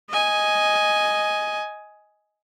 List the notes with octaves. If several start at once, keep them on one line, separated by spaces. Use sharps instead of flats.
D#5 G#5